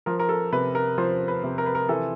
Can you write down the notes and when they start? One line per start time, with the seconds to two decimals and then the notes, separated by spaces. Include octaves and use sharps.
0.06 F3 A#4
0.20 A#4
0.29 A4
0.52 C3 B4
0.75 A#4
0.98 F3 C5
1.28 B4
1.43 C3
1.58 A#4
1.66 B4
1.75 A#4
1.89 E3 A4